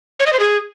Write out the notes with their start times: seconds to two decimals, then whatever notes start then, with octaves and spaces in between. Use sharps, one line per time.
0.20 C#5
0.26 D#5
0.33 C5
0.39 G#4